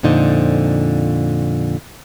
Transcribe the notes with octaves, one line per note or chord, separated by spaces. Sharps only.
F2 A#2 D3 D#4 C5